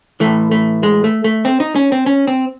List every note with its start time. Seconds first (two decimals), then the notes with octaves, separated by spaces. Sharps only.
0.20 A2 E3 A3
0.51 A3
0.83 G#3
1.04 A3
1.24 A3
1.45 C4
1.60 D#4
1.76 C#4
1.92 C4
2.06 C#4
2.27 C4